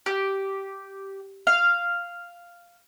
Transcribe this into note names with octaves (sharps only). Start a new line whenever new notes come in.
G4
F5